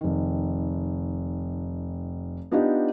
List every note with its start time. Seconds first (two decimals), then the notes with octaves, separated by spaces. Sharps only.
0.01 F1 D#3
2.51 B3 D4 D#4 F4 G4